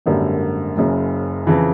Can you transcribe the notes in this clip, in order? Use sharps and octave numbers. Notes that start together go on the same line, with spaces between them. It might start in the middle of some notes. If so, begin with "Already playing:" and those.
G#1 F#2 D3 G3 A#3
F#1 F#2 C#3
F2 C#3 E3